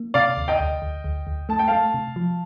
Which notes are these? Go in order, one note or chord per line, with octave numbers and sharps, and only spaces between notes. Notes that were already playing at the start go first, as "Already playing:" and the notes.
Already playing: A#3
C3 D5 F5
D2
D#5 G5
D2
D2
D2
D2
A3 A5
G5
A3 F5 A5
C3
F3